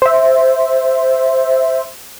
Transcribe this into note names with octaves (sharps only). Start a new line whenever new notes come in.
C5 E5